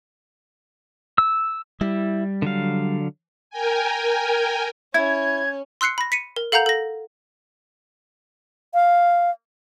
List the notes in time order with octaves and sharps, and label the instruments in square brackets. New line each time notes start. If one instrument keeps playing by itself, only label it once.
[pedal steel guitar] E6
[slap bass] G3 [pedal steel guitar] E4
[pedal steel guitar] D3 F#3 F5
[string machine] A#4 G5 G#5
[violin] C#4 [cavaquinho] E4 [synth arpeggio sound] G#6
[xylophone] C6 E6 F#6 C7 C#7
B5 A#6
B6 C#7 D#7
A#4
A4 F5 F#5 A#5 G6 F7
A4 A#6
[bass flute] F5